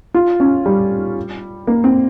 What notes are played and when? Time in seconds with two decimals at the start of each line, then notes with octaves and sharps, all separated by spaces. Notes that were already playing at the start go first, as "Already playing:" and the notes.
0.14 F4
0.40 C#4
0.66 G3
1.67 A#3
1.84 C4